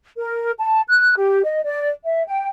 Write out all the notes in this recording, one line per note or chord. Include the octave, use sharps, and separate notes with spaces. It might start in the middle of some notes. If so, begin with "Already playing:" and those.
A#4
A5
F#6
G4
D#5
D5
E5
G5